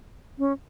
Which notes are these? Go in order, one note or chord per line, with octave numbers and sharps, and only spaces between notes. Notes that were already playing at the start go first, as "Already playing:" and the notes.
C#4